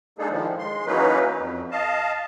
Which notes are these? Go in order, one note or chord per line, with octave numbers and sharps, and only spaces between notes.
G#3 A#3 D4 D#4 G#4 A4
A2 D#3 F3
G#3 C6
E3 F#3 A#3 C#4 D#4 B4
F2
D#5 F5 A5